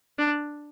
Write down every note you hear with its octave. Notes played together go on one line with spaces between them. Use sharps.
D4